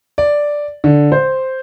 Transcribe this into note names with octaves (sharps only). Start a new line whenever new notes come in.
D5
D3
C5